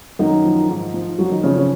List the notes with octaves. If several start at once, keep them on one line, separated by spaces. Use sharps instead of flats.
F#2 D#3 D#4
F3
G#2
F3
F#2 F#3 F#4
D#3 D#4
C#3 F3 C#4
C#3 C#4